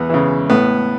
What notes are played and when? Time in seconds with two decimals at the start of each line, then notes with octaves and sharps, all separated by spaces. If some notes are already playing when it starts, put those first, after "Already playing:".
Already playing: E2 B3
0.10 C#3 E3
0.50 A2 B3